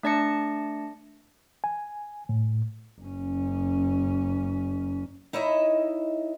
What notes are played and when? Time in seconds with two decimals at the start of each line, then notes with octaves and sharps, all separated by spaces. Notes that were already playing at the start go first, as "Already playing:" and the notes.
0.03 A3 D4 D5 A5 A#6 C#7
1.64 G#5
2.29 A2
3.01 F#1 C#4
5.33 D#4 E4 C#5 D#5 E5